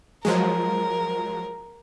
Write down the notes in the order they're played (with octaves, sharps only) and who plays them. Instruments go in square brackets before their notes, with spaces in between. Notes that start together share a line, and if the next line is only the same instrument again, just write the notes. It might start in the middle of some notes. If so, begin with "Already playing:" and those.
[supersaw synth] F3 F#3 G#3 [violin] A#4